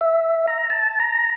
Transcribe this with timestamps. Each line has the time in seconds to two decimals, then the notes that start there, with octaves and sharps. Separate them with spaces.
0.01 E5
0.47 A#5
0.70 A5
1.00 A#5